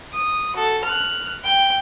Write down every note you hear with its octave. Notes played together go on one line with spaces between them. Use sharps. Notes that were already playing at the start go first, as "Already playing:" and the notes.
D#6
F#4 A4
F6 F#6
G5